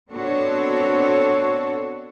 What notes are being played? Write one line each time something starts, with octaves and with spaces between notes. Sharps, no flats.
B3 C4 D4 F#4 A4 C#5